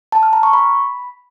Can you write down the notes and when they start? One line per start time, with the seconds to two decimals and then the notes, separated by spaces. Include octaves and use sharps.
0.12 A5
0.23 F6
0.33 A#5
0.43 C#6
0.53 B5